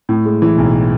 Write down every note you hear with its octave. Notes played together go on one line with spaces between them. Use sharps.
A2
G#3
E3
B1